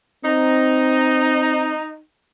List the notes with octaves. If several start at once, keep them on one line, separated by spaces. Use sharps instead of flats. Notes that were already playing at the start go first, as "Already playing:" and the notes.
C4 D#4